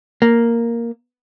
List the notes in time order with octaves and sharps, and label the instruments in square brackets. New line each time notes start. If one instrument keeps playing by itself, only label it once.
[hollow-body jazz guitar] A#3